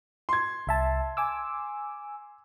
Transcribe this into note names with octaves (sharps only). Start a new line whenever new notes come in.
C6 G#6
C2 E5 A5
G#5 D6 E6